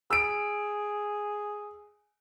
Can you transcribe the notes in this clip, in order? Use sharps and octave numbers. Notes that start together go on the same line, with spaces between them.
G#4 E6 D7